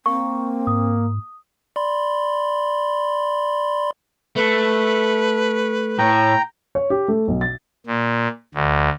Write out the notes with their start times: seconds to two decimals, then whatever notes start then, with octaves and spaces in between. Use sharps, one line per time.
0.06 A#3 C4 C#6
0.67 G#2 D#6
1.76 D5 B5 C6
4.36 A3 B4
5.99 A2 G5 A#5
6.75 C#5
6.90 G4
7.08 A3
7.28 B1
7.41 A6
7.86 A#2
8.54 D2